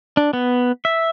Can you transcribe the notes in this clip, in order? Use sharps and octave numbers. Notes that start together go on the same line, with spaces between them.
D4
B3
E5